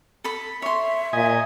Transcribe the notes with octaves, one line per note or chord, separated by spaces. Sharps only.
A4 B5
C#5 E5 C6
A#2 D#5 G#5